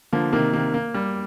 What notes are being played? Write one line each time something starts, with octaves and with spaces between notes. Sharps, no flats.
D3 F3 A#3
C3 D#3 A#3
C3 D#3 A#3
A#3
G3